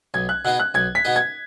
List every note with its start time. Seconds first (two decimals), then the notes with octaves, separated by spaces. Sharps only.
0.14 B1 G#6
0.29 F#6
0.45 B2 B3 D#4 G#4 F#6
0.60 F#6
0.74 B1 G#6
0.95 B6
1.05 B2 B3 D#4 G#4
1.16 G#6